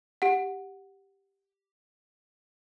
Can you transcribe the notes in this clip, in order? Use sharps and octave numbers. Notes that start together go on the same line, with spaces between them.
G4 F#5